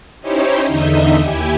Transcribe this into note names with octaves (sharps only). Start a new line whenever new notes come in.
C#4 D#4 E4 G4 C5 C#5
E2 D3 D#4 D#5 E5
D#2 E4 G4 G#5